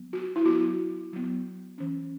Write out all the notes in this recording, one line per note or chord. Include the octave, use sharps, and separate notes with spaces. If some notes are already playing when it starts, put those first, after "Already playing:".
Already playing: F#3 B3
F#4
E4
F#3 B3 F#4
F#3 B3
E3 C#4